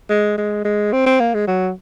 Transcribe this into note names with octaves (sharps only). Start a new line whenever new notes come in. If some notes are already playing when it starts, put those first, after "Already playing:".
G#3
G#3
G#3
C4
C4
A#3
G#3
F#3